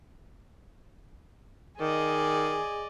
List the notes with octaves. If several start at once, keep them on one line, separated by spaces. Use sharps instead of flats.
D#3 G#4 D5 D#5